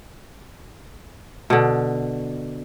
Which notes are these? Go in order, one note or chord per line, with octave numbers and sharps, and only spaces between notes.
B2 D3